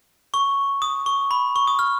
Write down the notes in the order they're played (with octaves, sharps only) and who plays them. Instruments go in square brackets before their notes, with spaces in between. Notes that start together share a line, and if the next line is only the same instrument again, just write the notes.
[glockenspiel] C#6
D#6
C#6
B5
C#6
D#6
F6